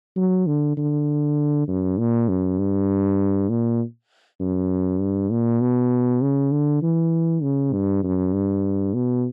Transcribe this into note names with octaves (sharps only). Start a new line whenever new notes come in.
F#3
D3
D3
F#2
A#2
F#2
G2
A#2
F#2
G2
A#2
B2
C#3
D3
E3
C#3
G2
F#2
G2
B2